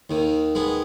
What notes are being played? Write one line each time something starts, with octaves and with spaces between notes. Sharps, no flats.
D#2 D#3
G#3 B3